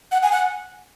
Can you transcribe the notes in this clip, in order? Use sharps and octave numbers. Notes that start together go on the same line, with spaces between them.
F#5
G#5
F#5